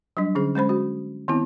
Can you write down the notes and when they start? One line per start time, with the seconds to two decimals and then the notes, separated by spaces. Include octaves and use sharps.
0.17 F#3 G3 D4
0.35 D3 C#4 G#4
0.55 G#3 C#4 C5 B5
0.69 F#4
1.28 D#3 B3 C4 E4